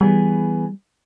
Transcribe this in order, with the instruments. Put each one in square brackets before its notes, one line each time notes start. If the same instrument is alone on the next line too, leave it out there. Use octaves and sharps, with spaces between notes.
[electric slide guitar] E3 B3 G#4 [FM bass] G3